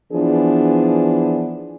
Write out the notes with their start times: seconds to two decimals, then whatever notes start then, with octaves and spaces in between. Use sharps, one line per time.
0.13 E3 F3 B3 D4 G#4